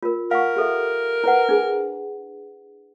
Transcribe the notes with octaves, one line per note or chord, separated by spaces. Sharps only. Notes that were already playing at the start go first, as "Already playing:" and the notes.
F4 A#4
A#4 F5 F#5 C#6
G4 A4 E5
E4 B4 F#5
D4 G#4